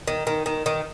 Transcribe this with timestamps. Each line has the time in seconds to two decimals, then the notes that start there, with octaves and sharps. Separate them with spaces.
0.07 D#3
0.27 D#3
0.46 D#3
0.66 D#3